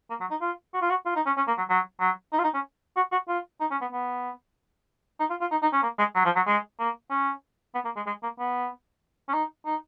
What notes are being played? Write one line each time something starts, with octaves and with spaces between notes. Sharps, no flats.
A#3
F#3
D#4
F4
F#4
F4
F#4
F4
D#4
C#4
C#4
A#3
F#3
F#3
F#3
D#4
F4
D#4
C#4
F#4
F#4
F4
D#4
C#4
B3
B3
D#4
F4
F4
D#4
D#4
C#4
A#3
G#3
F#3
F3
F#3
G#3
A#3
C#4
B3
A#3
G#3
G#3
A#3
B3
C#4
D#4
D#4